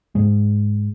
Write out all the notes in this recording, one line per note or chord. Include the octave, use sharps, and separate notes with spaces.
G#2 G#3